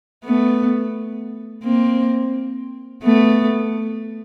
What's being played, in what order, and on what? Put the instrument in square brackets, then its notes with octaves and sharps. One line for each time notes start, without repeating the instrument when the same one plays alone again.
[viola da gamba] A3 B3
A#3 C4
A3 B3